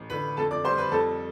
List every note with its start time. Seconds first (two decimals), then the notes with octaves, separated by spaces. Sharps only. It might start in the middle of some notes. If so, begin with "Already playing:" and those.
Already playing: A1
0.10 D3 B4 B5
0.37 F2 A4 A5
0.51 D5 D6
0.64 G3 C5 C6
0.78 B4 B5
0.92 F2 A4 A5